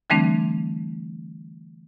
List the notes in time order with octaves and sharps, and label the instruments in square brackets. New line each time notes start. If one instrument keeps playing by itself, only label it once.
[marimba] D3 E3 G3 A3 C4 D4